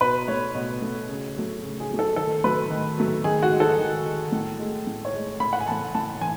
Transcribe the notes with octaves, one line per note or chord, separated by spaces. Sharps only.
B2 B4
A3 C#5
B2
A3
C#3
F#3 A3
C#3
G#4
F#3 A3
A4
D#3 A4
F#3 A3 B4
D#3
F#3 A3
D#3 G#4
F#4
G#3
A4
D#3
G#3
A2
G#3
A2
C#5
G#3
A2 B5
F#5
G#5
E3 A3 A5
A2 A5
E3 G#5